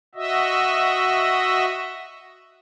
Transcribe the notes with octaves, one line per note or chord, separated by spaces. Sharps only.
F#4 D#5 E5